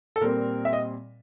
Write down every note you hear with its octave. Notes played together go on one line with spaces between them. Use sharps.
A4
A#2 G3 C4 A#4
E5
D#5